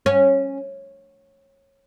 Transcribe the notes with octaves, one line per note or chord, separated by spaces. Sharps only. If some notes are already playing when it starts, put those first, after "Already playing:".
C#4